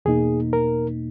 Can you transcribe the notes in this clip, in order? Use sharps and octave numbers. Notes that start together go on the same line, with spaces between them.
E2 B2 A#3 D#4 G#4
A#4